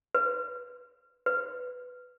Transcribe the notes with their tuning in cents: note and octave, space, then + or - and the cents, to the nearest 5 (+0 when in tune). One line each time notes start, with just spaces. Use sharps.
B4 -5
B4 +10